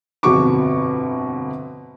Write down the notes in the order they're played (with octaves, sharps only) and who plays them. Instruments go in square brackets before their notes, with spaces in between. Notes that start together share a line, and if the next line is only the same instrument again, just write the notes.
[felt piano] G1 F2 B2 F#4 C#6 D6